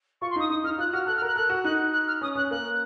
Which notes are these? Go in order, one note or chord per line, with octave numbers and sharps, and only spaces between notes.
F4 C#6
C6
D#4 D#6
D#4 D#6
D#4 F6
F4 F#6
F#4 F6
A4 F#6
F6
A#4 F#6
A4 F#6
F#4
D#4 F#6
F#6
F6
C#4 D#6
C#4 F#6
A#3 F#6